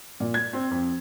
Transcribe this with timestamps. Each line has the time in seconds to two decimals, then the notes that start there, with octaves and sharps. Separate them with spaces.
0.20 A#2
0.34 G#6
0.53 C4
0.71 F2